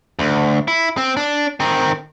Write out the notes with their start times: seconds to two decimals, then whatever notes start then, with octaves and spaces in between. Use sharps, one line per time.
0.19 D2
0.68 E4
0.97 C4
1.17 D4
1.60 D#3 C4